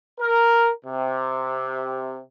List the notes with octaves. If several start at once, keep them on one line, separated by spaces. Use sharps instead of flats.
A#4
C3